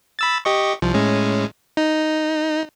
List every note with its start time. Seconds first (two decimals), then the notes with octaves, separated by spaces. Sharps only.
0.19 B5 E6 A6
0.45 G4 D#5 C#6
0.82 C2 F3
0.94 A2 G#3 C#4
1.77 D#4